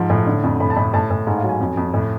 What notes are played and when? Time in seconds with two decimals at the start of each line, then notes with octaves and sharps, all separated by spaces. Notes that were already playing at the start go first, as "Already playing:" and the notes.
Already playing: G#2 F3
0.10 A2
0.26 D3
0.43 F2
0.60 A2 B5
0.70 A5
0.76 A2 B5
0.94 A2 A5
1.10 A2
1.27 G#2
1.38 F5
1.43 F#3
1.49 G#5
1.60 F2
1.77 F2
1.94 A2